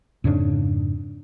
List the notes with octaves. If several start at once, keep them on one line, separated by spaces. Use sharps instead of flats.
F2 G#2 C#3 D4